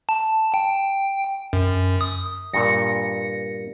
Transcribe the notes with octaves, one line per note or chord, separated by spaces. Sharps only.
A5
G5
F#2
D#6
G2 A#2 A#6 C#7